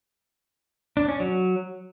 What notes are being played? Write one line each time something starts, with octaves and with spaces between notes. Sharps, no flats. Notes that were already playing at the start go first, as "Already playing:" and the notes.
D4
C#4
F#3